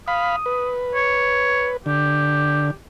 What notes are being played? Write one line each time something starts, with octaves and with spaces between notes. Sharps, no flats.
F5 B5 D#6
B4
C#5
D3 G4